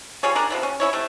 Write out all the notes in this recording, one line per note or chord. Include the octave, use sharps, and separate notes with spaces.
G3 F4 G#4 C#5
D4 G#4 A#4
C3 F3 B3
C#4
C#4 E4 C#5
C3 A3